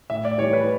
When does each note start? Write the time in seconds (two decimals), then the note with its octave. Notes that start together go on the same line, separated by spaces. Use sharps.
0.10 A2 E5
0.25 D5
0.38 E3 G3 C#5
0.53 B4